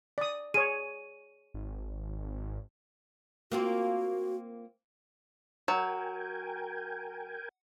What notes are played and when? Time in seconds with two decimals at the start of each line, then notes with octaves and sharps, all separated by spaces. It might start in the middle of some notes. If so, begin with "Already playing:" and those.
0.18 D5 D#6
0.54 G#4 C#5 D#7
1.54 G#1
3.52 A#3 C4 F4 F#4
5.68 F#3 A#4 G5 G#5